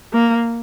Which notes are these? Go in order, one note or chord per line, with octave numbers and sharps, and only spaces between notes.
A#3